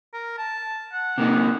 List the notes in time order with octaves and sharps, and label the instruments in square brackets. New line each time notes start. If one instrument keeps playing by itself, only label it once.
[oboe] A#4
A5
F#5
[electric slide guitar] C3 A#3 D#4